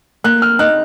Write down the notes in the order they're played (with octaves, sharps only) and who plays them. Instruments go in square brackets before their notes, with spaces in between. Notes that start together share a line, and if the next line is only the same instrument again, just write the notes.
[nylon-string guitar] A#3 [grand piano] F#6
[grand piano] F6
[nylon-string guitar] D#4 [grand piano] F#6